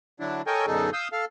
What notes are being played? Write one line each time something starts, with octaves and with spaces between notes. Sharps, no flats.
D3 F#3 D4 E4
A4 A#4 C#5 D#5 G5 G#5
F#2 B2 D3 D#4 G#4 A4
F5 D#6 E6 G6
A4 F5